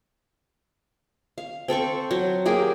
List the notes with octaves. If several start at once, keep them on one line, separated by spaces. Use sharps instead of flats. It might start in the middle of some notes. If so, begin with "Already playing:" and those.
F5
C4 A4 C5 C#6
F#3
A#3 G4 G#4